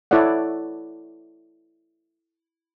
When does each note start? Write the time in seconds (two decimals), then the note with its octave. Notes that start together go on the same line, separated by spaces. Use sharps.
0.11 E4 A4 C#5 D5 F#5